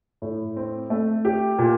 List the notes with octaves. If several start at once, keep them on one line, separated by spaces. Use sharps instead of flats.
A2
C4
A3
G4
A#2